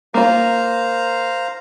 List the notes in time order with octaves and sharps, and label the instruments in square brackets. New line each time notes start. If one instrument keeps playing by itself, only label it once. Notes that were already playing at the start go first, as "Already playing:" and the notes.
[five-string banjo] A#3 F4 [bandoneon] C5 F5 A#5